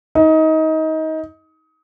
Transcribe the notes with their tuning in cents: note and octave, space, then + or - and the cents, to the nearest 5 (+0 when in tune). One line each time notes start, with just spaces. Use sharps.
D#4 +25